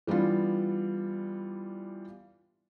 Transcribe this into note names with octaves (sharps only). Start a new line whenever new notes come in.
E3 G3 B3 D4 F4